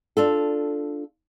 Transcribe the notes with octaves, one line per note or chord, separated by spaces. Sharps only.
D4 F4 A4